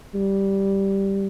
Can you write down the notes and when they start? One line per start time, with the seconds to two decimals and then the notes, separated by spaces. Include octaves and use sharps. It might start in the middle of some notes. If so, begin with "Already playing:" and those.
0.14 G3